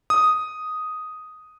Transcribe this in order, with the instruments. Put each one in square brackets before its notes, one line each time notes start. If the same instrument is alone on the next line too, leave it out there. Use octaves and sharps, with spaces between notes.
[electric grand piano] D#6